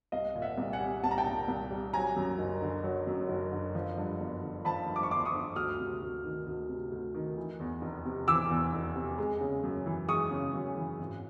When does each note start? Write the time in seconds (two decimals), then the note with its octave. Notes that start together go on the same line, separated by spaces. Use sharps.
0.12 C2 D#5 F5
0.35 A#2
0.42 E5 F#5
0.58 C2
0.73 F#5 G#5
0.80 G3
1.04 C2 A5
1.11 A#5
1.18 G5 A5
1.26 A#2
1.48 C2
1.71 G3
1.93 F#3 G#5 A#5
2.16 F#2
2.39 F#1
2.62 D3
2.84 F#3
3.07 F#2
3.29 F#1
3.52 D3
3.75 F3
3.98 G2
4.20 G1
4.42 D3
4.65 F3 A5 B5
4.88 G2
4.96 D6
5.03 C#6
5.11 G1 C6 D6
5.25 C#6 D#6
5.34 D3
5.56 D2 D#6 F6
5.79 C3
6.01 D2
6.24 D#3
6.46 D2
6.69 C3
6.92 D2
7.14 D#3
7.37 E3
7.60 E2
7.82 F1
8.05 C3
8.28 E3 D6 E6
8.50 E2
8.73 F1
8.96 C3
9.18 G#3
9.41 C#3
9.64 F#2
9.86 E3
10.09 G#3 C#6 D#6
10.31 C#3
10.54 F#2
10.77 E3
10.99 G#1